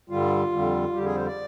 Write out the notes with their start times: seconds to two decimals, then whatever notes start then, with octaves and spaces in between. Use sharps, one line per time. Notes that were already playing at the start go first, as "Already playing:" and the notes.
0.09 G2 D3 G3 F4
0.51 F2 D3 G3
0.94 F2 D3 G3 G4
1.05 G#4
1.15 C5
1.26 D5